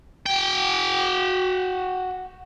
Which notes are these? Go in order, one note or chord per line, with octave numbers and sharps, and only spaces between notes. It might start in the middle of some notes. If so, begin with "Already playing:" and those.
F#4 G5